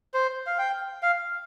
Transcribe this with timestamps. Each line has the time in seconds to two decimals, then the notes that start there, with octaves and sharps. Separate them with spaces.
0.14 C5
0.46 F5
0.58 G5
1.03 F5